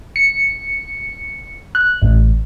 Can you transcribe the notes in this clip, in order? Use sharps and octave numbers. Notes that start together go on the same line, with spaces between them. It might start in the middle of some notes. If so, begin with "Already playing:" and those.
C#7
F#6
A1